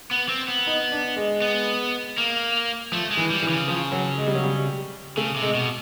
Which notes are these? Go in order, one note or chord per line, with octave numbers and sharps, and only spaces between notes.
B3
C4
B3
D#4
D4
G#3
B3
A#3
F3 A3
G#3
E3
G3
E3
C#3
F3
F#3
G#3
G3
F#3
G3
C#3 A3
C3
G#3
B2